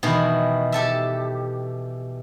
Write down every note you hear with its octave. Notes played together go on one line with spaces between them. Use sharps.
B2 D#3 E3
G4 A4 E5